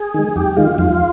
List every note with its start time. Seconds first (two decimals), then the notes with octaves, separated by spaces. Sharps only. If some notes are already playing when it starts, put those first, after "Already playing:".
Already playing: G#4
0.14 D#3 G#3
0.36 F2 G4
0.56 D#3 G#3 F4
0.78 F2 F4